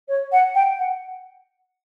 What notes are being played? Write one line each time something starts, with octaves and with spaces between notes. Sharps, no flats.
C#5
F#5
G5
F#5